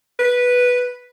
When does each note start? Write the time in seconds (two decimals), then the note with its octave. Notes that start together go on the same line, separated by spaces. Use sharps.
0.19 B4